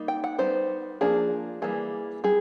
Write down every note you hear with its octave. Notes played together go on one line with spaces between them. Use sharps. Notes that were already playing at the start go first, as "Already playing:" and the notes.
Already playing: G3 A#3 D#4
G5
F#5
G3 B3 D#4 C5
F3 A#3 D4 G#4
E3 G3 A#3 G#4
G3 G#4